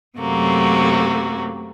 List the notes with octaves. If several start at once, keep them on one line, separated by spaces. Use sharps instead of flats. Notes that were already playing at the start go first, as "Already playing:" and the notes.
F#2 C3 F#3 A3 A#3 F#4